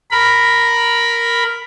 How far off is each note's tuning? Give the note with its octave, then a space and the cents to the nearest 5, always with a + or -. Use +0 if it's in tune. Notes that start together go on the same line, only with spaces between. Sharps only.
A#4 +0 B5 +0